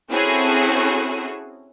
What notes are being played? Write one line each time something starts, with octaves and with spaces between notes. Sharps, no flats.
C4 C#4 E4 F#4 G#4 A4